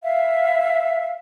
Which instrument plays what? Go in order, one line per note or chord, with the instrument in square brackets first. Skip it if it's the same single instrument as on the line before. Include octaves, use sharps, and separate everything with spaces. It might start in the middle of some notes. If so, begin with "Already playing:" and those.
[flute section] E5 F5